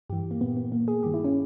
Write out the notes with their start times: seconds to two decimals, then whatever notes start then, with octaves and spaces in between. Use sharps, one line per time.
0.09 G2 G4
0.12 E3
0.31 A#3
0.41 A#2 B3
0.56 B3
0.72 A#2 A#3
0.88 G#4
1.03 G2 D#3 G4
1.14 E4
1.24 C#4